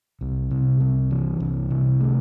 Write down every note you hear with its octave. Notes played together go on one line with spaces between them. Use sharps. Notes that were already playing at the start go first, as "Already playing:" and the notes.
C2
C3
C2
E3
C2
C3
A3